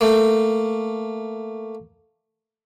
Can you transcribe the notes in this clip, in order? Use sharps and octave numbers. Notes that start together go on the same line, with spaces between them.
A3 A#3